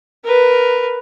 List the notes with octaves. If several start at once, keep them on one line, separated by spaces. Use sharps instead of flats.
A#4 B4